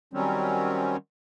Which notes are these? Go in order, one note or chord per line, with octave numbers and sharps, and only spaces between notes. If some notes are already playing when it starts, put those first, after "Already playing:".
D#3 F#3 G3 C4 C#4